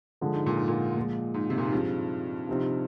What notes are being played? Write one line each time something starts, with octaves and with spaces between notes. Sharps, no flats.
D3 F3 G#3
G#2
A#2
G#2
A#2
A#2 F3 G#3
G#2
C3
A#2
G#2
G2 F3 C4 D#4 G#4
C3 F3 C4 D#4